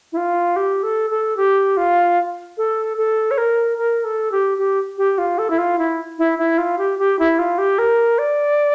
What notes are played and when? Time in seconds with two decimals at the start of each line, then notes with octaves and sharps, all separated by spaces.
0.12 E4
0.17 F4
0.56 G4
0.83 A4
1.10 A4
1.37 G4
1.77 F4
2.57 A4
2.97 A4
3.31 C#5
3.38 A#4
3.78 A#4
4.04 A4
4.32 G4
4.58 G4
4.98 G4
5.18 F4
5.38 A4
5.50 E4
5.58 F4
5.78 E4
6.18 E4
6.38 E4
6.58 F4
6.78 G4
6.99 G4
7.19 E4
7.39 F4
7.58 G4
7.78 A#4
8.18 D5